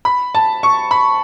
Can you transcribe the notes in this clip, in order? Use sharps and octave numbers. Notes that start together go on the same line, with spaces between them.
B5
A5
C#6
B5